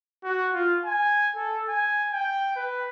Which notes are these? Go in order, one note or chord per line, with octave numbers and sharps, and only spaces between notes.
F#4
F4
G#5
A4
G#5
G5
B4